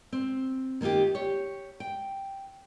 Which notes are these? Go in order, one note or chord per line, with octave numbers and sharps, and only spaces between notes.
C4
D#3 A#3 D#4 F4 G4
G4 C#5
G5